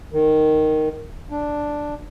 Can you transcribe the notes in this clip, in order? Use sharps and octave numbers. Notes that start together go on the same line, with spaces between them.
D#3
D4